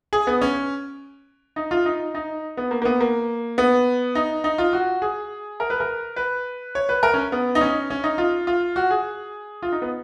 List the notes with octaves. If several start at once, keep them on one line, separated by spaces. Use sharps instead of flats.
G#4
B3
C#4
D#4
F4
D#4
D#4
B3
A#3
A#3
B3
A#3
B3
D#4
D#4
F4
F#4
G#4
A#4
B4
A#4
B4
C#5
B4
A#4
C#4
B3
D#4
C#4
C#4
D#4
F4
F4
F#4
G#4
F4
D#4
B3